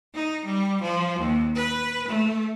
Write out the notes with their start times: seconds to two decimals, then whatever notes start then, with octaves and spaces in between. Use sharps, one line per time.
0.14 D#4
0.45 G3
0.81 F3
1.19 D#2
1.56 B4
2.08 A3